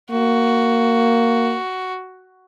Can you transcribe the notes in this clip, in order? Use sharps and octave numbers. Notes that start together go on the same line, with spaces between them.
A#3 F#4